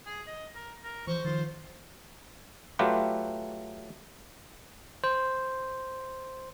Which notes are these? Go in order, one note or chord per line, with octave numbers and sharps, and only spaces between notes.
G#4
D#5
A#4
A#4
E3 F3 C5 C#6
D#3 F3 F4
F#3 A3 F4 G4 B4
C5